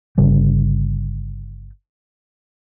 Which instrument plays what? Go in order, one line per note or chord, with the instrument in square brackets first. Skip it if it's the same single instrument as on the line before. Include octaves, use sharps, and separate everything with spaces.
[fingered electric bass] G1 C#3 G3